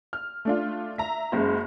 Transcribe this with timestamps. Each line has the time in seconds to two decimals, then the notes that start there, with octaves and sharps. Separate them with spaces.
0.13 F6
0.45 A3 D4 F4
0.98 E5 A#5
1.32 F#1 F#2 G#3